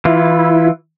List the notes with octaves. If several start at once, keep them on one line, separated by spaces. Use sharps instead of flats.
E3 E4 F4